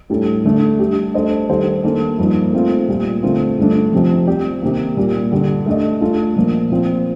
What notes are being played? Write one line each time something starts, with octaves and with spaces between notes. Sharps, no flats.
A2 G3 D4 A4
D3 A3 D4
G3 D4 G4
A3 D4 A4 C5 D#5
D#3 G3 D4 A4 C5
D#3 A#3 D4 A4
G2 F3 A#3 D#4
A3 C4 F4
A#2 G3 A#3
D3 A3 C4 F4
G2 D3 A3 D4
F2 C3 F3
G3 C4 G4 D5
C3 D#3 A#3
A#2 G3 A#3
G2 D3 G3 D4
A3 D4 A4 D#5
A3 D4 F4 A4
A#2 F3 A#3
A#2 F3 C4 F4